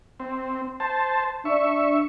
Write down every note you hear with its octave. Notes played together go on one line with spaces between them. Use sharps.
C4
C5 A5
D4 E5 C#6